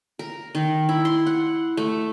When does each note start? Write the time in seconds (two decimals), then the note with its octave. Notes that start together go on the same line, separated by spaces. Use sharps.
0.19 A#4
0.55 D#3
0.89 E4
1.05 C6
1.26 F#5
1.77 A3